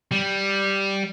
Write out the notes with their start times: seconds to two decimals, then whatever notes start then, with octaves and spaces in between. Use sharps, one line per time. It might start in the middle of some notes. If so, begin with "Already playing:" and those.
0.11 G3